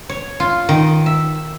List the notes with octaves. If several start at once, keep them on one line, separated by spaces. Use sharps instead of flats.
C#5
F4
D#3
E5